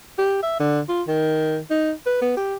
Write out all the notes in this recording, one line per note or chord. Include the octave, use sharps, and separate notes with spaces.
G4
E5
D3
F4
D#3
D#4
B4
B3
G4